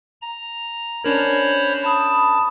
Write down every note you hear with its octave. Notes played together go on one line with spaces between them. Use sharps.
A#5
C#4 D4 A#4 C5 C#5 B5
A5 B5 D#6